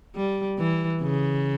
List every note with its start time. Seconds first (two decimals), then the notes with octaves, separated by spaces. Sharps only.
0.15 G3
0.58 E3
1.01 C#3